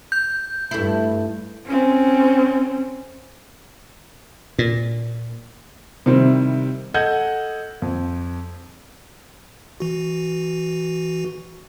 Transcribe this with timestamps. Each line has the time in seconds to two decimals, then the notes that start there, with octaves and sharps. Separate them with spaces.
0.12 G6
0.71 G2 A3 E4
1.67 C4 C#4
4.59 A#2
6.06 C3 D#3 G3 C4 E4
6.94 A4 D#5 F#5 G6 G#6
7.82 F2
9.80 E3 F#4